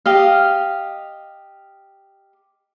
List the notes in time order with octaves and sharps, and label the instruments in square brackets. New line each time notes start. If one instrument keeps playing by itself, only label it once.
[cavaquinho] G4 D#5 F5